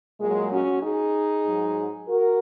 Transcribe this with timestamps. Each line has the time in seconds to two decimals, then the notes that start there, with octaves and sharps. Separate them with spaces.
0.20 A#2 F#3 G#3
0.52 C#4 F#4
0.83 D#4 G#4
1.45 G#2 F#3
2.09 F#4 A#4